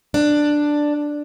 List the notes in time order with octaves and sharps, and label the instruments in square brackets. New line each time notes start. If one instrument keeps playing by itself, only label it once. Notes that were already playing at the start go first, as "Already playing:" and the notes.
[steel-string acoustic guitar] D4